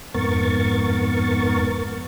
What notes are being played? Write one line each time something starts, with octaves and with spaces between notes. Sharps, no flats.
F2 G#2 B3 A#4 C#6 A6